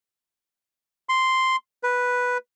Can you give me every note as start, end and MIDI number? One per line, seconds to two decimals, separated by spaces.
1.09 1.56 84
1.83 2.38 71